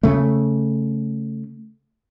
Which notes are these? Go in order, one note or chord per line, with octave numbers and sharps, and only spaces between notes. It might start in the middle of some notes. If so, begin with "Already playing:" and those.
C#3 A3